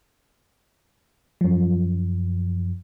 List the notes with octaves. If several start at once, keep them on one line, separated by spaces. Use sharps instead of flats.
F#2 F3